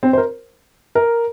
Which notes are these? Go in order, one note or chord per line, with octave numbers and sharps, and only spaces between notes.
C4
C5
A#4
A#4